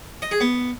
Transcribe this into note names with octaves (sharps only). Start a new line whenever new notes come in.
D#5
G#4
B3